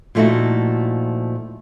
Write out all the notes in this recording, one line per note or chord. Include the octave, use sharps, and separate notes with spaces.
A#2 F3 A3 D#4 E4 F#4